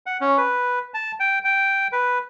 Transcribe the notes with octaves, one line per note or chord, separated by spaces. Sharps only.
F#5
C#4
B4
A5
G5
G5
B4